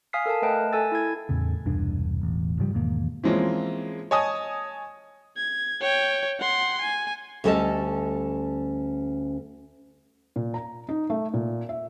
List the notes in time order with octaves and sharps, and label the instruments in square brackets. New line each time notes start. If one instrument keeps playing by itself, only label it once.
[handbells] F5 G#5 D#6 F6 B6 C7
A4 A#4 F5 A5
A3 B4 D#5 G5 A5
A4 G#5 E6 A6
E4 G#6
[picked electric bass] E2 A2 C#3
E1 C2 G2 D4
E1 A1
G#2 C#3 F3 G3
E1 G#2 D#3 A#3
[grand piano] E3 F3 G#3 A#3 C4 C#4
C#5 D#5 G#5 A5 D#6
[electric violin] G#6
C#5 G5
F#5 C6
G#5
[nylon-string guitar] D2 G3 C#4 A4 D#5 A5
[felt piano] A#2
A#5
D#4
A3
A#2
E5